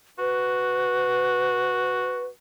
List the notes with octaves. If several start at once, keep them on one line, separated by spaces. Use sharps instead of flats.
F#4 B4